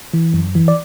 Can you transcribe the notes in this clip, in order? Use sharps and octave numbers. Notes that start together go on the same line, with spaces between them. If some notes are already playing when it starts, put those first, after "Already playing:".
E3
F#2
E3
D5